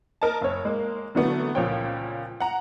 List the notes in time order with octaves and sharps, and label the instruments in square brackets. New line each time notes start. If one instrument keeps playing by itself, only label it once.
[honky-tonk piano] A#4 D#5 A5
F#1 C#5
G#3 A#3
D3 E3 F#3 A3 B3
C#2 A#2 F3 C#5 G5
F#5 A#5